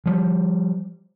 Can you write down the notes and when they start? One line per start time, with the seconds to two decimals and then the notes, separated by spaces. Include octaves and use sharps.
0.06 F3 G3